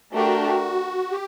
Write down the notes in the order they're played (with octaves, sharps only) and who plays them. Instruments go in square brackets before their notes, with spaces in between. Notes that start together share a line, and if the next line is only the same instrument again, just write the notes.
[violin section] A3 D4 G4 A#4 [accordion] F#4
[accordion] G4